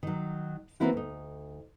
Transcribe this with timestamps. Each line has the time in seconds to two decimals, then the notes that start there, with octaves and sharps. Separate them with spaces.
0.03 D#3 F#3
0.80 E3 F#3 A#3 C4 E4 F#4
0.93 D2 D#4